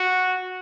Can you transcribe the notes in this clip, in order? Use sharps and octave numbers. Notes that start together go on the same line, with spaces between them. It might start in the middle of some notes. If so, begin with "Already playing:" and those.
Already playing: F#4